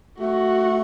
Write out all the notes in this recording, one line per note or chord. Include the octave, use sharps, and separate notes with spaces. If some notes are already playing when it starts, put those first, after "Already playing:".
A3 F#4